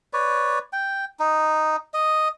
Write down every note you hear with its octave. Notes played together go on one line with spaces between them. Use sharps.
B4 C#5 D5
G5
D#4
D#5